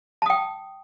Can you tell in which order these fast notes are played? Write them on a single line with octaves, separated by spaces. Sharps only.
A5 D#6 G5